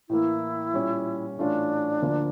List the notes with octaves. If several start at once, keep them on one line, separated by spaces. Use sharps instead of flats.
A2 E3 A#3 E4
A#2 G3 C#4
A2 E3 A3 C#4 D4 F4
D2 D3 F3 A#3